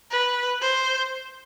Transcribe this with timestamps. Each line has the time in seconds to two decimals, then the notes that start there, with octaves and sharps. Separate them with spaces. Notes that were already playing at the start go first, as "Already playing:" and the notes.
0.11 B4
0.62 C5